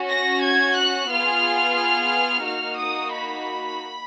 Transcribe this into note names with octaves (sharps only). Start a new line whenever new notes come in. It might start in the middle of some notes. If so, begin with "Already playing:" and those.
Already playing: C#4 F#4
A#6
G#6
F#6
B3 F4 G#4 F6
A#3 D#4 F#4 F6
D#6
B5